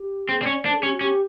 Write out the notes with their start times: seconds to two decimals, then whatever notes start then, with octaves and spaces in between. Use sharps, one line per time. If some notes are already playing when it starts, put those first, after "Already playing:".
Already playing: G4
0.28 C4 G#4
0.41 C4 D5
0.46 C#4
0.53 D5
0.64 D4 C5
0.73 A4
0.79 G#4
0.83 C#4 G4
0.92 F#4
1.01 C#4 G4